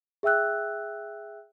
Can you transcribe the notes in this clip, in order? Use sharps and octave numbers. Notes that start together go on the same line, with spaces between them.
G#4 E5 G5 E6 F#6